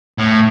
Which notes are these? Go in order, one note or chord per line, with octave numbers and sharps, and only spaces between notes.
A2